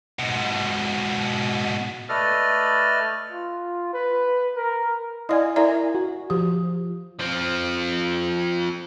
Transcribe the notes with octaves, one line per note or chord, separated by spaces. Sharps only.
G#2 B2
A3 A4 B4 D5 D#5 F6
F4
B4
A#4
E4 D5 D#5 F5 G#5
E4 A#4 D5 E5 G#5 A#5
F#4
F3 F4 G4
F3 C4